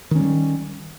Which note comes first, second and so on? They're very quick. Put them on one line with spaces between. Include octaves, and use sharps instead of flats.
D#3 C#4 G3